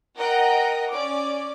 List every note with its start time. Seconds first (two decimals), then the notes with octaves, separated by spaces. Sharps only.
0.16 A#4 D#5 F#5 G5 A#5
0.91 C#4 D5 D6